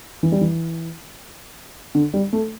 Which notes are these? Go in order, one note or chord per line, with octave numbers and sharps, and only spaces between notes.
E3
G3
E3
D3
G3
A3